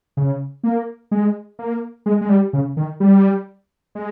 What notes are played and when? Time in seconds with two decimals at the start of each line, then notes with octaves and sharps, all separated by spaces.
0.17 C#3
0.64 A#3
1.11 G#3
1.59 A#3
2.06 G#3
2.21 G#3
2.29 G3
2.53 C#3
2.77 D#3
3.00 G3
3.95 G#3